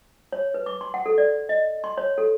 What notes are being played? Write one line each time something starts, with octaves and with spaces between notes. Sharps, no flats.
C#5
B4
D6
C6
F#5
A4
D5
D#5
C6
C#5
A4